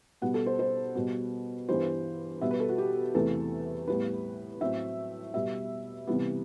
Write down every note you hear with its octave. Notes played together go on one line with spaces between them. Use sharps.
B2 G3 B3 F#5
A4
C5
C5
B2 G3 B3
G2 E3 G3 B3 C5
B2 G3 B3 E5
B4
A4
F#4
G4
E2 C3 E3 A3 A4
A2 G3 B3 B4
A2 F#3 A3 C4 E5
B2 G3 B3 E5
C3 E3 G3 B3